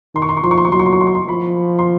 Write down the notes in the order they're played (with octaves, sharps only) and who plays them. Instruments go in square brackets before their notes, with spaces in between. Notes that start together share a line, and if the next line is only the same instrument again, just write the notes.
[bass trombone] D#3 [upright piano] C6
[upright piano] C#6
C6
C#6
[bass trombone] F3 [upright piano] C6
[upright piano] C#6
C6
C#6
[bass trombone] F#3 [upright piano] C6
[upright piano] C#6
C6
C#6
C6
C#6
C6
[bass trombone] F3 [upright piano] B5
[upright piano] C6